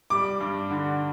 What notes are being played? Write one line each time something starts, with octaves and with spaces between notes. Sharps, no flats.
G3 D6
G2
D3